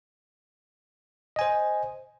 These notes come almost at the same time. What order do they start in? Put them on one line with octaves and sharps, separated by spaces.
D#5 G#5 C5